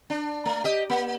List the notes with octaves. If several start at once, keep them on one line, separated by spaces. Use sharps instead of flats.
D4
A3
G4 D#5
A#3